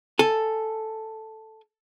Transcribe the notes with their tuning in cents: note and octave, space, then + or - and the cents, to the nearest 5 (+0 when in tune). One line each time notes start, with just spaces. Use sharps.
A4 +0 G#5 +0